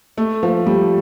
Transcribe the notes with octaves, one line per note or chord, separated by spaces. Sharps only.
A3
F3
G3